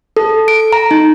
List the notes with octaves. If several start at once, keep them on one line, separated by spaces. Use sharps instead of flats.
A4
D7
A#5
D#4